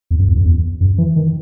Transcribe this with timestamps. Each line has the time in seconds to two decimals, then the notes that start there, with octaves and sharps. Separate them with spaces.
0.11 E2
0.19 F#2
0.28 E2
0.36 F#2
0.45 E2
0.81 F#2
0.98 E3
1.16 D#3